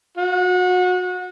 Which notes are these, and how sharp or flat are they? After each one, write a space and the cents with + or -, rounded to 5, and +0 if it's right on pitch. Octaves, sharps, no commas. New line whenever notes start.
F#4 -30